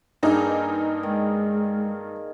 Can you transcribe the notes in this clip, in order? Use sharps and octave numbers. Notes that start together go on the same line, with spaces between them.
G2 A#3 D4 D#4 G#4
D#3 G#3